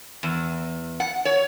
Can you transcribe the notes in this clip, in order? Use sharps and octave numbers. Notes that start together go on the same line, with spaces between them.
E2
F#5
C#5